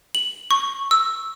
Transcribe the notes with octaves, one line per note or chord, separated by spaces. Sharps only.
F#7
C#6
E6